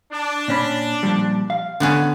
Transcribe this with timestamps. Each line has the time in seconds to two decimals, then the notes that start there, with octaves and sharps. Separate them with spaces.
0.12 D4
0.48 A#2 C#4 B5
1.03 A#2 F3 G3
1.50 F5
1.80 D3 B3 C#4